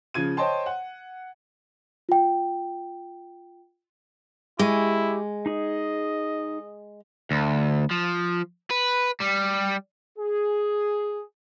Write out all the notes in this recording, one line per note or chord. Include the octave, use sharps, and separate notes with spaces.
C#3 F3 G#6 D#7
C5 C#5 D#5 G5 A5 C6
F#5
F4 G5
G#3 E4 G4 G#5 C#6
D#4 G#4 D#5
D2
F3
B4
G3
G#4